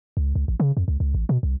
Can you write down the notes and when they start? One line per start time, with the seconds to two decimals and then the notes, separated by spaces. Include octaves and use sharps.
0.17 C#2
0.36 C#2
0.48 A1
0.60 C#3
0.77 F2
0.88 C#2
1.00 C#2
1.15 A1
1.29 B2
1.43 C2